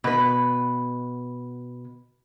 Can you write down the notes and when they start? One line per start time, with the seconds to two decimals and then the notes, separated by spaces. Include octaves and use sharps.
0.04 B2 B4